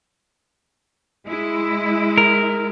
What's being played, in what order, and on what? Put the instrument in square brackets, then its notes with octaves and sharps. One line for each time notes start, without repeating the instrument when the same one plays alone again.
[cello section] G#3 E4
[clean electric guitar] A#4